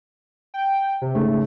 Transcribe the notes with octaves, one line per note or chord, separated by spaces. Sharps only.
G5
C3
G#2 C#3 A3